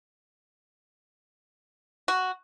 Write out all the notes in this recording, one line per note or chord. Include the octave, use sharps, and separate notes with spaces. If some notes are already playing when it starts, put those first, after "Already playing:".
F#4